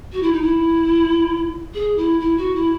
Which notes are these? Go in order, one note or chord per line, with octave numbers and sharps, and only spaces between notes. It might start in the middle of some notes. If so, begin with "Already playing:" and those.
F#4
E4
D#4
E4
G#4
E4
E4
F#4
E4